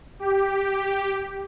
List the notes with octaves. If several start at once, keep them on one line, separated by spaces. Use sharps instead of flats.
G4